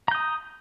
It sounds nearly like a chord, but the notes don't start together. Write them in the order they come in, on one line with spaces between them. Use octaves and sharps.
A#5 G6 D#6